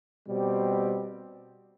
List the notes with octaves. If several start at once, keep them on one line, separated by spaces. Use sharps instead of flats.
B2 G3 C4 G4